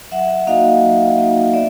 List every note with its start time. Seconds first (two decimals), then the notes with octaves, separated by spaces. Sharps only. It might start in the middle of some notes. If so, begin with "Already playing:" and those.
0.11 F#3 E5 F#5
0.47 A#3 D#4 F#4 D#5 F5
0.83 F#3
1.18 A#3 D#4 F#4
1.53 B3 D5 E5